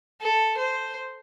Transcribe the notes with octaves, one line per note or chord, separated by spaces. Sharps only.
A4
C5